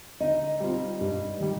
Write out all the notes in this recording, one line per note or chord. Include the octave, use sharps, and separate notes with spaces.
D3 D#4 D#5
G3 C4 F4
G2
D#3 G3